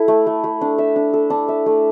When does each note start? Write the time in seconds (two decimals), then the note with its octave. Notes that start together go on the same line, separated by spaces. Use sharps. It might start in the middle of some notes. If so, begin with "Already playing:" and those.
Already playing: E4 A4
0.08 A3
0.27 A3
0.44 A3
0.61 D4
0.78 E5
0.96 D4
1.13 A4
1.30 D4
1.49 E5
1.66 A3